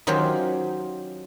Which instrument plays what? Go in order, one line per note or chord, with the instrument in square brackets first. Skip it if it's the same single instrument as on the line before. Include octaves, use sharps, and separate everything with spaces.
[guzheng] D#3 F#3 C#4 F4 G4 C5